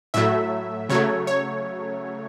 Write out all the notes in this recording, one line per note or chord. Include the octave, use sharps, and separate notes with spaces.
A2 F#3 A3 E5
C#3 F#3 A3 C#5
C#5